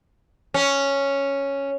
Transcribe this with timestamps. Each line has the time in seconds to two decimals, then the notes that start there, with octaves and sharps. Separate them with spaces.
0.54 C#4